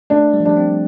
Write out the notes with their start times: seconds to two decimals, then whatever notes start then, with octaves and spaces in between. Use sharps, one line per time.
0.10 A3 D4
0.34 G3
0.40 F3
0.45 G3 D4
0.57 C4